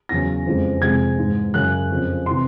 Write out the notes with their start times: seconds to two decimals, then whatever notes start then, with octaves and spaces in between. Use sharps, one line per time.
0.09 E2 C#3 F#3 A#6
0.46 F2 C#3 E3 G#3
0.82 F2 C3 F3 G#3 G#6
1.19 G#2 E3 G#3
1.54 F#2 C#3 F#3 F#6
1.90 F2 C#3 F3
2.26 C3 E3 C6